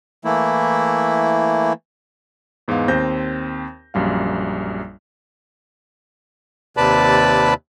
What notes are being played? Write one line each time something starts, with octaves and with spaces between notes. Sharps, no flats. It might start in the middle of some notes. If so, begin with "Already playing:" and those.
E3 A3 A#3 E4
E2 G#2 G#3 B3 F5
D#2 C4 C5 G6 A#6
A#1 F#2 G3 F5
D#2 C3 B4 D5 A5 B5